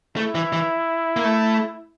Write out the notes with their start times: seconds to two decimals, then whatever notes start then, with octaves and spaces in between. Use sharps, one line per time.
0.16 A3 E4
0.35 E3
0.53 E3
1.17 A#3
1.24 A3